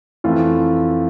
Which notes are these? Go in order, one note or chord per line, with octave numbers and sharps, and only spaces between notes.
F2 E3 A3 F4